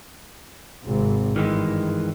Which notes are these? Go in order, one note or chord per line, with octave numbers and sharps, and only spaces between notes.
G#1 C3
G2 D#3 E3 G#3